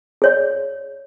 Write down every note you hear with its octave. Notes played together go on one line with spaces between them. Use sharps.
G#4 C#5 D5